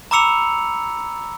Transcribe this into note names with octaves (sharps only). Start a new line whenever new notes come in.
A#5 B5 D6 E6 C#7 F7